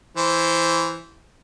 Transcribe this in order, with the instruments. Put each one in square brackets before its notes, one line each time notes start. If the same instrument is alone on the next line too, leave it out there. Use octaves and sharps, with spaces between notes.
[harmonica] E3 C5